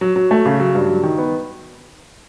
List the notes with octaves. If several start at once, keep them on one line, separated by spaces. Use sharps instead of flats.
F#3
F#3
A3
C#3
F#3
G2
F#3
D#3
B3